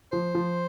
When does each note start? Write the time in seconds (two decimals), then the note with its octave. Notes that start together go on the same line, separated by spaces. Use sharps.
0.12 F3 C5
0.35 F3